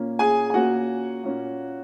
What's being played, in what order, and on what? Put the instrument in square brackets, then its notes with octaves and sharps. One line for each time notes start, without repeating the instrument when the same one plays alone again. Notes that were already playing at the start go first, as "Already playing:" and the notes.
Already playing: [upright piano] A#2 A#3 C#4
G#4 G#5
G#5
A#2 A#3 C#4 F#4 F#5
A#2 A#3 C#4